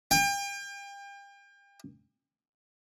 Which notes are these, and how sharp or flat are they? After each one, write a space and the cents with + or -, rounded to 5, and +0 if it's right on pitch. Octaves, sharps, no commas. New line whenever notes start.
G5 +35